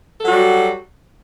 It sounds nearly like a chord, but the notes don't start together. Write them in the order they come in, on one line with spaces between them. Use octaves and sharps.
A4 F#3 F#4 G3